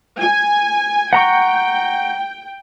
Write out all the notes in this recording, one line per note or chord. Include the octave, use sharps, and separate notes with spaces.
G#5
F#5 G5 A#5 C#6